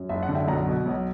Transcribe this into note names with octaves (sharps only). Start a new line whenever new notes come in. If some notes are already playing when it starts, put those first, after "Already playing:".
Already playing: F#2
F#1 E5
F#5
D3
E5 G5
B1 F#5 A#5
B2
B1